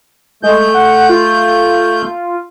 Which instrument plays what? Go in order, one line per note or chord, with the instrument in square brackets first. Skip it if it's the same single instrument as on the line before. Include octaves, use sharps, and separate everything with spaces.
[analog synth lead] G#3 [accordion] A3 G6
[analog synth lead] F#5
F4